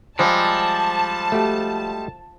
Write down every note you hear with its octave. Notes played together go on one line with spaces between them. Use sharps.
F3 G3 G#3 A5
A3 F#4 G4